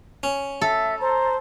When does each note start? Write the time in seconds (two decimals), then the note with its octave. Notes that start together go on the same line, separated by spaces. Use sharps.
0.23 C#4
0.61 A4 E5
1.01 C5 A#5